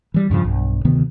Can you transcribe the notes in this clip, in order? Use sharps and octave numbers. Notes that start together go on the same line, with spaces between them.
E3 G3
E2 G2 C#3 F3
B1 G2
D2 C3 D#3 B3